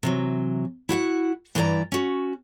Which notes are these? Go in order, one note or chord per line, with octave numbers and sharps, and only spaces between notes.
C3 E3 F#3
E4 F#4 F5 F#5
G2 E3 E4 A#4 D5 A#5
C#4 F#4